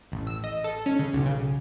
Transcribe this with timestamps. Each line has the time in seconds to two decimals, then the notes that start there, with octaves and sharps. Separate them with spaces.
0.12 A1
0.27 E6
0.44 D#5
0.64 A4
0.86 C#4
0.99 C#3
1.13 B1
1.26 C#3